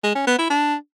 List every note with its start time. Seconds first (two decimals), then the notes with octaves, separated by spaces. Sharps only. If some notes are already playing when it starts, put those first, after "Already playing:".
0.04 G#3
0.15 C#4
0.27 B3
0.39 E4
0.50 D4